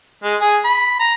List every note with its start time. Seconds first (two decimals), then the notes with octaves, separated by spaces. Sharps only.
0.24 G#3
0.41 G#4
0.65 B5
1.00 A#5